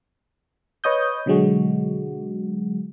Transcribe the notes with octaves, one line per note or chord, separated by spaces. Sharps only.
B4 C#5 D#5 D#6 G6
B2 D3 F#3 G#3 F#4